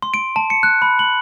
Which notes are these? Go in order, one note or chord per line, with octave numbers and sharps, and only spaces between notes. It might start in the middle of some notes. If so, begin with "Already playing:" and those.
C6
D7
A5
C#7
F#6
B5
F#7